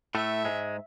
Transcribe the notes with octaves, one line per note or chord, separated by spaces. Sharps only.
A2 A3 E5
G#2 G#3